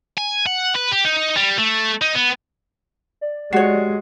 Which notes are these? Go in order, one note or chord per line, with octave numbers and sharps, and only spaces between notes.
G#5
F#5
B4
G4
D#4
G3
A3
D#4
B3
D5
G#3 F#4 G4 C#5 C7